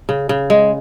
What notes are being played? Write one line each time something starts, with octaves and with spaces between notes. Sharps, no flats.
C#3
C#3
G#3